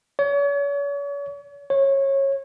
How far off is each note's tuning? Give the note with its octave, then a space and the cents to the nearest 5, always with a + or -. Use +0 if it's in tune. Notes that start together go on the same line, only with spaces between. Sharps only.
C#5 +40
C#5 -20